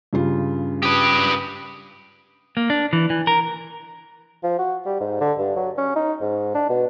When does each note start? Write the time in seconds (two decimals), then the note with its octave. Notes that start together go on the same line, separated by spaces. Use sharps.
0.13 G2 C#3 F4
0.83 G4 B4 D#6
2.57 A#3
2.70 D4
2.93 E3
3.10 E3
3.27 A#4
4.43 F3
4.59 F#4
4.86 G3
5.00 G#2
5.21 D3
5.38 G2
5.56 F#3
5.78 C#4
5.96 D#4
6.21 G#2
6.55 D4
6.69 B2